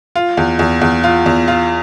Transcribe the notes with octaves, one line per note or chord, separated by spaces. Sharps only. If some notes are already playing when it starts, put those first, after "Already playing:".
F4
E2
E2
E2
F4
E2
F4